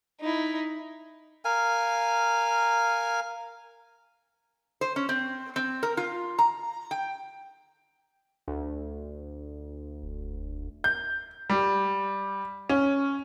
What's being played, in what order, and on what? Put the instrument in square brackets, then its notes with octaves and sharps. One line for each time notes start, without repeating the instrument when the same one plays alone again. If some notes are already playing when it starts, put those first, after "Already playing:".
[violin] D#4 E4
[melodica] A#4 F5 G#5
[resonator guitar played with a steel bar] C5
C#4
C4
C4
A#4
F4
A#5
G5
[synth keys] D2
[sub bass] E1
[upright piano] G6
G3
C#4